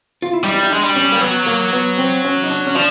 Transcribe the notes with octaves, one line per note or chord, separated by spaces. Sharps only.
F4
E4
G3 D#4
E4
D#4
G#3 D4
G3
C#4
A#3
F#3 B3
A#3
B3
C4
C#4
D#4
D4
C#4
F3 D4